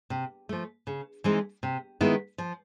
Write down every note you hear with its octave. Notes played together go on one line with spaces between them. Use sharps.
C3
F3 A3
C#3
E3 G#3 C4 D#4
C3
D#3 G#3 B3 E4
F3